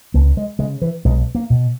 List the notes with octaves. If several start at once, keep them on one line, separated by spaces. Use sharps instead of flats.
C#2 A#3
G#3
C#3 G#3
E3
B1 G#3
A#3
B2